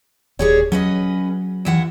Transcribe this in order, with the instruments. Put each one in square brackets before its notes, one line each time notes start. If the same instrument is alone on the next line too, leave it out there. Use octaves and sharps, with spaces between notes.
[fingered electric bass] D#1 [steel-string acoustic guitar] G3 G#4 C#5
[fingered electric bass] F#3 [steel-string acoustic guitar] C#4 B4 D#5
[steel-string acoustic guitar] D#2 E3 F#5